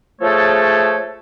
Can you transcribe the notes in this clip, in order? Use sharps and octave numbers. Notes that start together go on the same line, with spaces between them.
F3 A3 G#4 A4 C#5